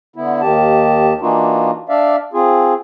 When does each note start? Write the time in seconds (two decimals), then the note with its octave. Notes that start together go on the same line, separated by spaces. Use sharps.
0.16 D3 B3 E4
0.42 D#2 D#3 G4 A5
1.21 E3 A#3 D4 D#4 F4 F#4
1.89 D4 D5 E5 F5
2.33 C4 F4 G#4